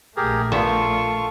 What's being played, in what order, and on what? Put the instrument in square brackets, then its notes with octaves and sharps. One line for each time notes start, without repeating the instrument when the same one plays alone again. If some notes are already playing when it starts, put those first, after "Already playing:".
[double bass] A#1 A3 [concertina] G4 G#4 A#4
[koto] A#2 B3 E5 [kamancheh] F4 A4 [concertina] C#6